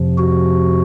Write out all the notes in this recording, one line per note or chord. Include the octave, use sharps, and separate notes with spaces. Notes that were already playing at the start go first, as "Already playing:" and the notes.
Already playing: F2 C3 F3
F#4